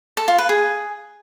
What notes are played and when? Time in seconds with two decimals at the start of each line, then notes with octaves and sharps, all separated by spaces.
0.17 A4
0.28 F4
0.38 B4
0.49 G#4